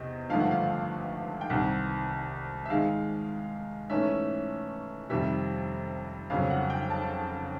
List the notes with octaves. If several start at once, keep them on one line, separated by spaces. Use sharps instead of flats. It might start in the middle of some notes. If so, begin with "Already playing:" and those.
Already playing: E2 C3 D#5
G#1 G2 D3 F3 A3 F5
F#5
F5
G5
C2 C3 D#3 F#5
E5
G#2 D#3 G#3 F5
G#2 E3 A3 C#4 E5
F2 C3 D#3 G3 E5
G1 F2 C#3 F#3 F5
F#5
G5
A5